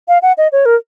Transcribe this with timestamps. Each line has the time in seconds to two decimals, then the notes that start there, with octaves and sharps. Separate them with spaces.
0.08 F5
0.22 F#5
0.38 D#5
0.52 C#5
0.66 A#4